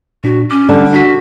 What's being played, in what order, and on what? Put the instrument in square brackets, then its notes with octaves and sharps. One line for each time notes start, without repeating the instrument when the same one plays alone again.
[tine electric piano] A#2 D4 [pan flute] F#4
[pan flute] C#4 [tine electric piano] D6
[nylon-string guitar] D3 G3 A5
[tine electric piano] D4 F#5 B6 [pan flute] F#4